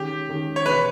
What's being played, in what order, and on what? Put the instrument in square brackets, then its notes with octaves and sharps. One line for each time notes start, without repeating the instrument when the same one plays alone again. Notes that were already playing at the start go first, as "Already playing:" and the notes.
Already playing: [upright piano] D#3 G#3 C#4 [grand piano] G4
[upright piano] D#3 G#3 C#4
[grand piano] C#5
[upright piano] E2 B2 G#3 [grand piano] B4